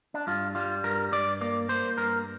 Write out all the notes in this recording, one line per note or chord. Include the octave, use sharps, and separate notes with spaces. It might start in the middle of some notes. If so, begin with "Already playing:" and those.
D4
G2 F4
G3 F4
G2 A#4
G2 D5
A#3 D5
A#3 C5
G2 A#4